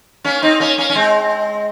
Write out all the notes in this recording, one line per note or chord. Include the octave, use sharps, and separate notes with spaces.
A#3 C#4
C4 D#4
A#3 C#4
A#3 C#4
C#4
G#3 C4